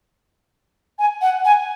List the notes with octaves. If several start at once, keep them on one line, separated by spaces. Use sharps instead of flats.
G#5
F#5
G#5